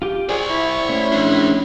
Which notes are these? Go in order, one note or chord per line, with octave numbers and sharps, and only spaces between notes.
F4 G4
G#4 C5 D5 C#6
E4
A3 C#4
F3 D4